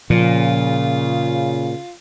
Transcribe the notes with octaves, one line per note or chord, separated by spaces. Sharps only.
A#2 C#3 F3 F4